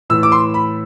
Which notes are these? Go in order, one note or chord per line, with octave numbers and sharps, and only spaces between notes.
A2 E3 E6
D6
C6
B5